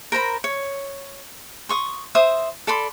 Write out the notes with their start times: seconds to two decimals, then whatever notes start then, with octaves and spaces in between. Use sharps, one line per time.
0.12 A#4 C5 A#5 B5
0.44 C#5
1.69 C6 C#6 D#6
2.15 C5 E5 D#6
2.67 A4 D5 B5 C6